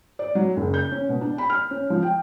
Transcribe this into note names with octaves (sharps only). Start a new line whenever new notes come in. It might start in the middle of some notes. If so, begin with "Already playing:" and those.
D5
F#3
F#1
G6
C#4
B2
D4
B5
F6
C#4
F3
G5